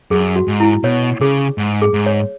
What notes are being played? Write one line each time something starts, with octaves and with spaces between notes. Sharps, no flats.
F#2 G#4
F#4
G#2
E4
B2 C#5
C#3 G#4
G#2
G#4
G#2
C#5